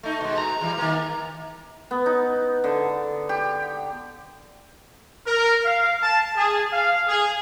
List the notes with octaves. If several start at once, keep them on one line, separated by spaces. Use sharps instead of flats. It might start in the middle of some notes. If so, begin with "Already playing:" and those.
A3 D#4
B2 G#3
A#5
E3 G3
D#3 A#3
B3
D#4
D3
G4
A#4
F5
A5
G#4
F5
G#4